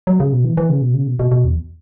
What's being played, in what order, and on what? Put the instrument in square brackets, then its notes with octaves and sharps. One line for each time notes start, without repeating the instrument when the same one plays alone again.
[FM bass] F#3
C#3
B2
E3
E3
C#3
B2
C#3
B2
B2
B2
E2